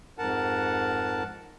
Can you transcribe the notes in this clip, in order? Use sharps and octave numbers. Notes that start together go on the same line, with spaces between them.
F2 G#2 A#4 F#5 A5